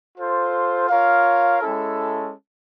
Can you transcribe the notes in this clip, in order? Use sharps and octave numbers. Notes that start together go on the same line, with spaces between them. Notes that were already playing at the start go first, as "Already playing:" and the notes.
F4 A4 C5
F4 A#4 C#5 F5
G#3 C#4 E4 A4